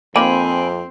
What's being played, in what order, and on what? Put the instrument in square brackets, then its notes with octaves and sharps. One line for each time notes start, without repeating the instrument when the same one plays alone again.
[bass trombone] F2 [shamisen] A#3 D#4 F4 [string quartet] C4 [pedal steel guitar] G5 G#5 B5